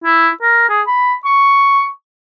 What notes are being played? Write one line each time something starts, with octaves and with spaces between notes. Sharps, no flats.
E4
A#4
G#4
B5
C#6